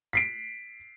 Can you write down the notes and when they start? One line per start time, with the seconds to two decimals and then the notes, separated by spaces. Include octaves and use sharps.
0.13 B6 C7 D7